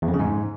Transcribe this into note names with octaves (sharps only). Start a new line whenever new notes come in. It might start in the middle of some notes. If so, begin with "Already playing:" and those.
E2
F2
C#3
G#2